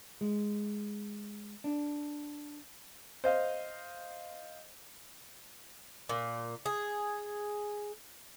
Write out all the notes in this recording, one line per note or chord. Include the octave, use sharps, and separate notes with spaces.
G#3
D4
C5 D#5 F5
A#2
G#4